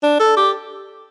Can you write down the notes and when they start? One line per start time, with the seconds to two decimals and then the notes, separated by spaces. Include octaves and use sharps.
0.03 D4
0.20 A4
0.37 G4